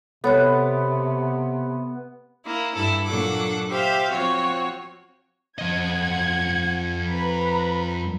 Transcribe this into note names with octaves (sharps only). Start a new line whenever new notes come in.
C3 B3 A4 C#5 F#6
A#3 E4
G2 E4 A4
A#2 F#3 D4 A4 F#5 D6
G4 C5 E5 F5 G5
F3 C4 F#4 C#5
F2 D#5 F#5 G#6
B4 A#5 B5